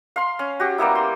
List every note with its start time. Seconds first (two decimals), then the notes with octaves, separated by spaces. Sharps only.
0.16 F5 C6
0.39 C#4
0.60 F#4 G4
0.78 G3 A#3 B3 E4
0.95 C6